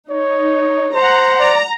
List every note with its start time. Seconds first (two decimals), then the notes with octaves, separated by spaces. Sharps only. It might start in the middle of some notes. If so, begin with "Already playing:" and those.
0.10 D#4 C#5
0.95 C5 F#5 A#5
1.39 D5 A#5